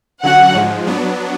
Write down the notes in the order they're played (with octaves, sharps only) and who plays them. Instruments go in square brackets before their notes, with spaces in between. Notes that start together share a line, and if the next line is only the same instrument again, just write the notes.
[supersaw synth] D3 F#3 C#4 F#4 [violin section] F#5
[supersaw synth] G#2 F3 G#3
F#3 B3 D4